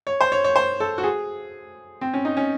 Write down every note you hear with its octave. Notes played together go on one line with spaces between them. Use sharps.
C#5
C5
C#5
C#5
C5
A4
F#4
G#4
C4
C#4
D#4
C#4